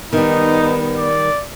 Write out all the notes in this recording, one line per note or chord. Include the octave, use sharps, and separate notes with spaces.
D#3 G3 B3 D#4
D5